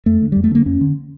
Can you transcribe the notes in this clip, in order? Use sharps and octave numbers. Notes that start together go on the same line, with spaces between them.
F2 A3
D3
F2 G3
A3
D3 A#3
F2 C#4
D3